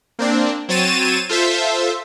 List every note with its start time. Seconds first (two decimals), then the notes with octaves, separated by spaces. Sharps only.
0.19 A#3 C4 D4
0.69 F#3 C4 C#5 A6 D#7 E7
1.29 F4 A4 C5 E5